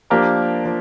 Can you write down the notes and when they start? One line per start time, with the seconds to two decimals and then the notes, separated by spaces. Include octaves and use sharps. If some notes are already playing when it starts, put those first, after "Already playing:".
0.10 F3 A#3 D4 G4 A#4
0.65 F3